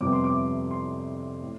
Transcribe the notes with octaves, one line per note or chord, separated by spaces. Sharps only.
F2 C3 G3 B3 D6
C6
D6
C6
A2